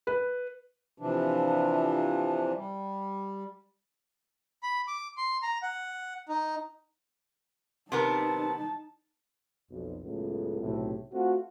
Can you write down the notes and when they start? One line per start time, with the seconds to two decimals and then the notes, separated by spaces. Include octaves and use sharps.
0.07 B4
0.98 C3 E3 F3 D4
2.56 G3
4.63 B5
4.88 D6
5.17 C6
5.43 A#5
5.63 F#5
6.29 D#4
7.92 C3 B3 D#4 A#4 A5
9.71 B1 F2
10.04 C#2 F#2 A2 C#3 A3 B3
10.61 B1 A2 C3
11.12 A3 C4 F4 F#4